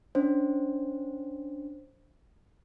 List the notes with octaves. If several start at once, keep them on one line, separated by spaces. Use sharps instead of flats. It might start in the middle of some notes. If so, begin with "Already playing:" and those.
C#4 D4 C5